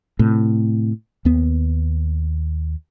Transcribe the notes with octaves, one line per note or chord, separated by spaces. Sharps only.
A2 C3
D#2 B3